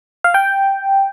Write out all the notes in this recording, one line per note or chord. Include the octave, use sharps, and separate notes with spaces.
F5
G5